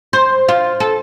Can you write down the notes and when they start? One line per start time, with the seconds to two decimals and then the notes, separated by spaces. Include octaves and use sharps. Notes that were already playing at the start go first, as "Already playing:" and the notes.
0.13 C5
0.48 F4
0.80 A4